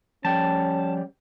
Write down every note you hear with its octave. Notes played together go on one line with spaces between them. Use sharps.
F3 G3 C#4 G5 A5